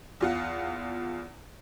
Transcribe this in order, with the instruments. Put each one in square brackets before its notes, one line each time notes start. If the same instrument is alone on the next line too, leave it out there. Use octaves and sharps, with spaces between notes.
[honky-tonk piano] E2 F4 F#5